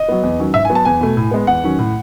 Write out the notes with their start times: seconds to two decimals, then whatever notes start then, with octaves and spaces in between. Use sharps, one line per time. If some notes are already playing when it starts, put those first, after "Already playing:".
Already playing: D#5
0.08 F#3 B3
0.23 E2
0.39 D#3 F#3 C#4
0.54 G#2 E5
0.65 G#5
0.69 F#3 B3
0.75 A5
0.85 E2 G#5
1.01 B2 A3
1.17 A2
1.31 G#3 B3
1.47 E2 F#5
1.64 D#3 F#3 C#4
1.79 A2